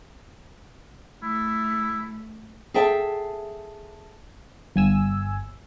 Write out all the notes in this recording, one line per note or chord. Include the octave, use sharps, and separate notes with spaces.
A3 E4
G#4 A4 E5 G5 A5
G1 G#5 E6